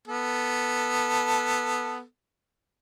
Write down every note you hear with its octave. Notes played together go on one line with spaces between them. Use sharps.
B3 A4